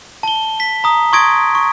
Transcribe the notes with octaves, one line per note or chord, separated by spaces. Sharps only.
A5 G7
B6
A#5 D#6
C6 C#6 D#6 G#6 A#6 D7
C#6